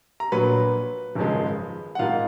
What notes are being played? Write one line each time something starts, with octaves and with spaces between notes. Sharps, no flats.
A#5
A#1 A#2 F#3 B4 B5
G#1 F#2 C#3 F3 G#3
F#5
G#1 G#2 D#3 F4 F5